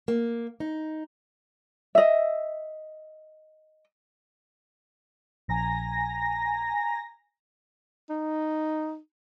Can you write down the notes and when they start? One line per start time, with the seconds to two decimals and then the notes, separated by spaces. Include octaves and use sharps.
0.08 A#3
0.60 D#4
1.95 D#5 E5
5.49 A#1 G#5 A#5 A#6
8.10 D#4